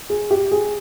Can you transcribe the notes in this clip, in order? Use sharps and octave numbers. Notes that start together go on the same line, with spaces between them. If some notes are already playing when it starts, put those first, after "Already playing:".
G#4
G4
G#4